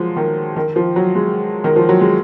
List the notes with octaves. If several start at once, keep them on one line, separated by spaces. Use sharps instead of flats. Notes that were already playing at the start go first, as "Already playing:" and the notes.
Already playing: F3 F#3 G#3
D#3
D#3
F3
F#3
G#3
D#3
F3
F#3
G#3